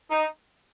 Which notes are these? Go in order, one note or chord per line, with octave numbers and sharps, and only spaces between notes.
D#4